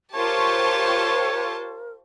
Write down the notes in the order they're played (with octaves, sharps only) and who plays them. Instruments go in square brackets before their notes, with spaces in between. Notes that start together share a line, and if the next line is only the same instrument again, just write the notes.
[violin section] F4 C5 A5 [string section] G4 C#6 [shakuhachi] A#4 [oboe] C#5